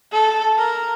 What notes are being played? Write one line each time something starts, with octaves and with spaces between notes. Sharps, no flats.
A4
A#4